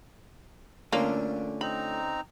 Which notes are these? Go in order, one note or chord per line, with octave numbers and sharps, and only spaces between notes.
D3 A3 A#3 C#4 D4 F4
C4 D#4 A#5 B5